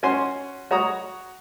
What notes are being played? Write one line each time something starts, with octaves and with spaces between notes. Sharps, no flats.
C#4 F#4 G#5 C6
F#4 C#5 A#5 D#6